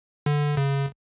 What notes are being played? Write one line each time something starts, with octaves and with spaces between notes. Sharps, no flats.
D3
C#3